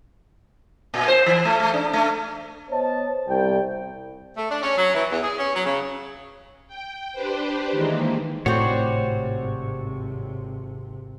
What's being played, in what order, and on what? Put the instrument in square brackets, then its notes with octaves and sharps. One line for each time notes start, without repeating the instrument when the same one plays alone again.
[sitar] A#2
C5
E3
A3
A3
D4
A3
[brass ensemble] B3 C5 C#5 D#5 A5
C2 G5
[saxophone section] A3
D4
C#4
F#3
E3
E2
G#4
C#4
F#3
C#3
[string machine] G5
D4 G4 B4 C5
D#3 E3 G#3 A#3
[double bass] G#1 C3 [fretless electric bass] A2 [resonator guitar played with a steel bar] C4 F#4 [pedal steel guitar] C#5 D5